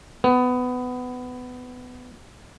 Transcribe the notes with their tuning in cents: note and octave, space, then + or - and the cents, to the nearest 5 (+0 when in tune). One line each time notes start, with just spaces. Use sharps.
B3 +20